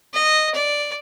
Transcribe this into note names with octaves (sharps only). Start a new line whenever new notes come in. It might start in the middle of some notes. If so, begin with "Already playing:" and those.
D#5
D5